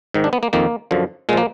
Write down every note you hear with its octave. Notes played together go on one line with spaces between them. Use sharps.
G#2 D#3
D4
B3
A#3
F2 D#3 A#3
F#2 D3 F3
A#2 F3 G#3 A#3